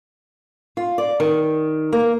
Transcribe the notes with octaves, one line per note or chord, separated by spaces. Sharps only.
F4
D5
D#3
A#3